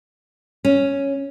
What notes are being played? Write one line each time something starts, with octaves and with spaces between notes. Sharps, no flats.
C#4